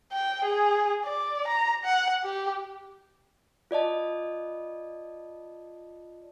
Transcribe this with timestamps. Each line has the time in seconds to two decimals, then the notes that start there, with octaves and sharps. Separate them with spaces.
0.12 G5
0.44 G#4
1.05 D5
1.48 A#5
1.85 F#5
2.24 G4
3.71 F4 D5 D#5 A5